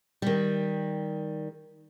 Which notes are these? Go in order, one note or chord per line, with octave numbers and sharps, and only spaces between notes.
D#3 G3